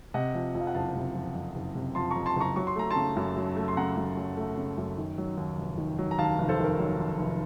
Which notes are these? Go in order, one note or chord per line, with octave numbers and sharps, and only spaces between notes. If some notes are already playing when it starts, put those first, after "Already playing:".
C3 D#5 F#5
F3
F2
F5
F#5
F#1 F5 A5
C3
F3
F2
F#1
C3
F3 A5 C6
A#5 C#6
F2
A5 C6
F#1 A#5 C#6
F#3 C#6
C6
A3 A#5
A5 C6
C#3
F#2
F#3
A3
C6
C#3 F#5 A#5
F#2
F#3
A3
C#3
F#2
D#3
F#3
D#2
F1
D#3
F#3
A#5
D#2 F5 A5
F1
A4 C5
D#3
A#4
F#3
D#2
F1